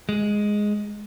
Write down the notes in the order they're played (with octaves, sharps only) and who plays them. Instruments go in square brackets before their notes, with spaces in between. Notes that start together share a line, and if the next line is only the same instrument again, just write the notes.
[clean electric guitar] G#3